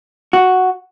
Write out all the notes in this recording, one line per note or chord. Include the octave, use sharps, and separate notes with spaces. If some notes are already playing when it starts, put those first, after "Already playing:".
F#4